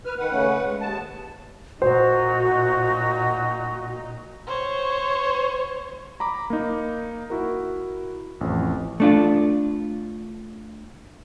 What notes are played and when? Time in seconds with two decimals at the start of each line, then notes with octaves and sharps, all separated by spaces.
0.05 B4 F6
0.19 D#3 B4 F#5
0.32 C#3 A3 C#4
0.64 G#3
0.81 D#2 A5
1.82 A#2 D#4 F#4 C5
4.47 C5 C#5
6.20 A#5 B5 D6
6.50 A#3 D#4
7.30 E4 F#4 A#4
8.41 A1 F2
9.00 A3 D4 F4